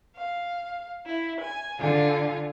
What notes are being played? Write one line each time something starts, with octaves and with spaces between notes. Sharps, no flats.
F5
E4
G#5
D3 F4 G#5